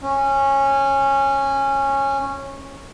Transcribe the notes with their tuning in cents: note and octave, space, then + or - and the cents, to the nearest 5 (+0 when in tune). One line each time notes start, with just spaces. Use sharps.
C#4 -15